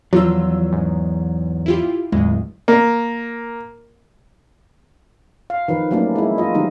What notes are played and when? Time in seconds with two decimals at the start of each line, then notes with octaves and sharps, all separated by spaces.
0.13 E2 F3 F#3 F4 E6
0.72 G#2
1.66 E4 F4 G4
2.12 D1 E2 G#3
2.68 A#3
5.50 F5
5.68 D#3 F3 B4
5.91 F#3 A3 A#3 C#4 D4
6.16 G#3 E4
6.38 F4 D#5
6.55 D#3 F#3 G3 B3 D#4